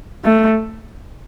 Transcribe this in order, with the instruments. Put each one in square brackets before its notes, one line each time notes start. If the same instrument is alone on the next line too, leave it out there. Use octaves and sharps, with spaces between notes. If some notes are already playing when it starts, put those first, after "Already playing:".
[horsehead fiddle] A3